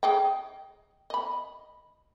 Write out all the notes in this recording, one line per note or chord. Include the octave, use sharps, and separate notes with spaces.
G#4 D#5 G5
D#5 B5